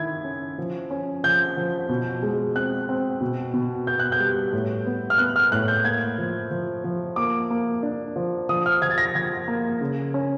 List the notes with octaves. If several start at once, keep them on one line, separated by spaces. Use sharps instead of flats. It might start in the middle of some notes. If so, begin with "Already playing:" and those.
Already playing: D#3 E4 G#6
C#4
F3
C#4
F3 G6
F3
B2
G#3
C4 F#6
C4
B2
B2
B3 G6
F#6
G6
G3
A2
B3
F6
B3 F#6
F6
A2 F#6
G6
A#3 G#6
F3
F3
F3
A#3 D6
A#3
D4
F3
F3 D#6
F6
F3 G#6
A6
A#6
F3 G#6
A#3
C#3
C#4